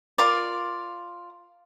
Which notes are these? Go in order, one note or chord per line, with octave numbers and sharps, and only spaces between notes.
F4 A#4 D5